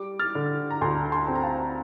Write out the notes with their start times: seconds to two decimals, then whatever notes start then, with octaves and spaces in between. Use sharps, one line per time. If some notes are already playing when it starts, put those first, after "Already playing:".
Already playing: G3 D6
0.19 F6 A6
0.35 D3
0.71 A#5
0.81 D2 A5 C6
1.12 A5 C6
1.27 C4 C6
1.35 A#5
1.43 F5 A5